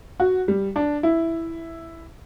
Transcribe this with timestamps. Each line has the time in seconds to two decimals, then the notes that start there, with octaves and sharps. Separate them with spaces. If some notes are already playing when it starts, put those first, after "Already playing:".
0.20 F#4
0.48 G3
0.76 D4
1.03 E4